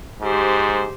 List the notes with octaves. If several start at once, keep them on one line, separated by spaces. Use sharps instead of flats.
G#2 G4 C5